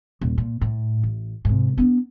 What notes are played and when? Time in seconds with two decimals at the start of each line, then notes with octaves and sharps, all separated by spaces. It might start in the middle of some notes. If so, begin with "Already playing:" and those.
0.21 D#1
0.38 A#2
0.61 A2
1.03 A1
1.45 G#2 C3
1.77 B3 D4